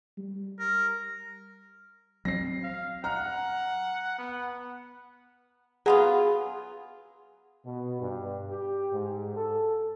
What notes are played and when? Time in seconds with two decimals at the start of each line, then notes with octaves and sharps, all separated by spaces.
0.17 G3
0.60 A#4
2.25 F#3 C4 A#6 C7
2.63 F5
3.04 F#5 A#5 F6
4.18 B3
5.86 F#3 B3 F4 G#4
7.66 B2
8.00 G2
8.50 G4
8.93 G#2
9.36 A4